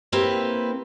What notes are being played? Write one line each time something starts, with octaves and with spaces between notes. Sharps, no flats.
A#3 C4 E4 G4 B4